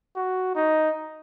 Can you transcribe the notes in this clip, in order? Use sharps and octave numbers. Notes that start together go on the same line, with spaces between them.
F#4
D#4